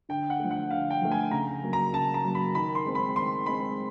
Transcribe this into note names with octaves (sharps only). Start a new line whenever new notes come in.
D3 G5
F#5
F3 A3
F#5
D3 F5
G5
F3 A3
G#5
C#3 A#5
F#3 A#3
A#5
C#3 A5
A#5
F#3 A#3
B5
D#3 B5
C6
G#3 C4
B5
D#3 C6
G#3 C4 B5